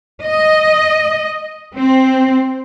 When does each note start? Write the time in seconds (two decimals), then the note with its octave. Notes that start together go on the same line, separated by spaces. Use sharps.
0.24 D#5
1.77 C4